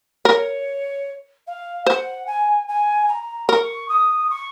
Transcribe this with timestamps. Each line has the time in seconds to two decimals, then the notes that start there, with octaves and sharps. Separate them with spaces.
0.25 A#4 C#5
1.47 F5
1.86 C5 F#5
2.27 G#5
2.68 G#5
3.08 A#5
3.48 A#4 C#6
3.88 D#6
4.30 C#6